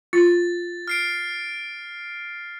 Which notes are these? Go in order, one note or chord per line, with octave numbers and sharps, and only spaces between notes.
F4 A6
F6 C7 D7